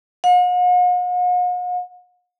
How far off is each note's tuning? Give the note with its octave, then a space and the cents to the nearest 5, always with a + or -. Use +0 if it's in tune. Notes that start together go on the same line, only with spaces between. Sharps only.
F#5 -45